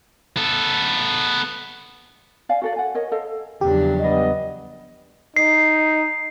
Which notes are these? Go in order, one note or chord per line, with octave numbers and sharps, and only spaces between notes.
B3 A4
D5 F5 G#5
F#4 A4 D5
F#5 G#5
A#4 C#5 D#5
A4 C5 D#5 F5
E2 C#3 F3 F#3 D4 G4
G3 B3 D#5
D#4 C7